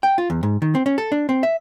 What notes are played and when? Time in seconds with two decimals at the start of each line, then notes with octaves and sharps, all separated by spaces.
0.03 G5
0.18 F4
0.30 E2
0.43 G#2
0.62 D#3
0.75 C4
0.86 C#4
0.98 A4
1.12 D4
1.29 C4
1.43 E5